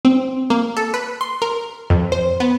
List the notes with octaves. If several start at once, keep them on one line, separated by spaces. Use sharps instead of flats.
C4
A#3
A4
B4
C6
A#4
F2
C5
B3